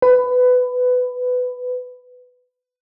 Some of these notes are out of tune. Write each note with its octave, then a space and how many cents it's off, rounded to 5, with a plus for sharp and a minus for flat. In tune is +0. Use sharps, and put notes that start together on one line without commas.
B4 +15